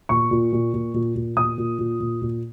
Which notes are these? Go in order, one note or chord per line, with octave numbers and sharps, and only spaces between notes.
A#2 C#6
A#2
A#2
A#2
A#2
A#2
A#2 D#6
A#2
A#2
A#2
A#2